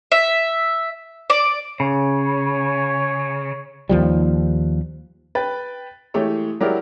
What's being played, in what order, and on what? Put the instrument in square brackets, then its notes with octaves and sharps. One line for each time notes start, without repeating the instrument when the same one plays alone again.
[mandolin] E5
D5
[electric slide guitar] C#3 [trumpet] C#5
[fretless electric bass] D#2 F3 G3
[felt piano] B4 G5 A6
E3 G#3 A3 G4 C#5
F#3 G#3 E4 G4 A#4 D5